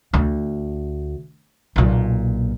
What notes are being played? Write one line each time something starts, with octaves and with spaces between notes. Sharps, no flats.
D2
B1 A#2